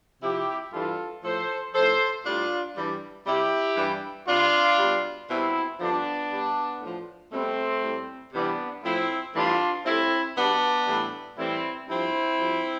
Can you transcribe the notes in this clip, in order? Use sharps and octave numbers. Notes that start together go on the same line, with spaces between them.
C3 F3 E4 G4
G2 E3 G3 F4 A4
A2 F3 A4 C5
A2 F3 A4 C5
A2 G3 D4 F4
G2 E3 G3
C3 G3 E4 G4
G2 E3 G3
C3 G3 D4 F4
B2 G3
B2 G3 C4 E4
G2 D3 F3 B3 D4
B2 G3
A2 F3
B2 G3 A3 C4
A2 G3
C3 E3 G3 B3 D4
A2 F3 C4 E4
A2 E3 G3 D4 F4
A2 G3 C4 E4
B2 G3 B3 D4
A2 E3 G3
A2 E3 G3 C4 E4
G2 F3 C4 E4
G2 F3